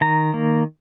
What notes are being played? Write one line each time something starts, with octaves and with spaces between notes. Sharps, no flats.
D#3 A#5
A#3